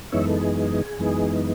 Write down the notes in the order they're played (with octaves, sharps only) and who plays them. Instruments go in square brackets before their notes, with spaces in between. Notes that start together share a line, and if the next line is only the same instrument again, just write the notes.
[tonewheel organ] F#2 E3 G#3 B3 D#4 C#5 E5
A4
G#4
F#2 E3 G#3 B3 D#4